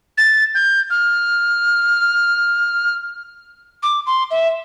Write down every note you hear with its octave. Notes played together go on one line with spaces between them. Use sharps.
A6
G6
F6
D6
C6
E5